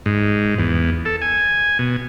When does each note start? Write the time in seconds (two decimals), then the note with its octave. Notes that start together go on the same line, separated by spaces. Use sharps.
0.06 G#2
0.59 E2
1.05 A4
1.22 G#5
1.79 B2